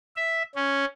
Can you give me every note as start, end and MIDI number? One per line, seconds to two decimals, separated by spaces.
0.17 0.43 76
0.55 0.85 61